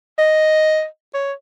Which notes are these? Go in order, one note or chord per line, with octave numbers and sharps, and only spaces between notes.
D#5
C#5